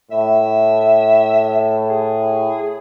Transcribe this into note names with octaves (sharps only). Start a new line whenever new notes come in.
A2 E5
G#4